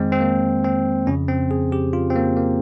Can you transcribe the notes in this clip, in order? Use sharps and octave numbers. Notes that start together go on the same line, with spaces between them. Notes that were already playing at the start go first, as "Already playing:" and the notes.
Already playing: F2 D#3 G#3 C4
C4
A#3
C4
F2 C#3 F3 C#4
C4
G#4
G4
F4
C4
A#3
A#3